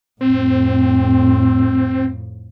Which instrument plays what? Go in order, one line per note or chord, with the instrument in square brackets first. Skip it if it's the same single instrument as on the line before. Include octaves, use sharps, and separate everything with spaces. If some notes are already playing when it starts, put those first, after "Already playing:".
[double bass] F2 A2 [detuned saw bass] C4